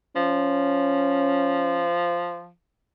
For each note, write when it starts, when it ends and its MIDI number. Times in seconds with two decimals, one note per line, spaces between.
0.16 2.51 53
0.16 1.88 61